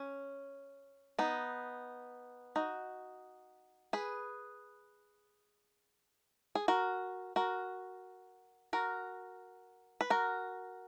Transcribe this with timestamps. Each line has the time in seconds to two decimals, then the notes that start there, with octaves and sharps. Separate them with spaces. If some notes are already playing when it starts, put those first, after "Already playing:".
Already playing: C#4
1.19 B3 D#4
2.56 D#4 F#4
3.93 G#4 B4
6.55 G#4
6.68 F#4 A#4
7.36 F#4 A#4
8.73 F#4 A#4
10.01 B4
10.10 F#4 A#4